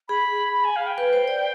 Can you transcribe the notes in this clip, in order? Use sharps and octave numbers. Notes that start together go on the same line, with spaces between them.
G#4 B5
B5
G#5
F5
G5
B4
C5
D5